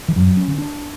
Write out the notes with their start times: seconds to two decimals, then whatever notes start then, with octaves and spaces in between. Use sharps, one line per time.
0.08 E3
0.16 F#2 F#3
0.37 C#4
0.48 D3
0.58 D4